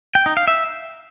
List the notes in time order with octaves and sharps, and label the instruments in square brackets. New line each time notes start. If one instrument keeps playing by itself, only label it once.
[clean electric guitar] G5
D#4
F5
E5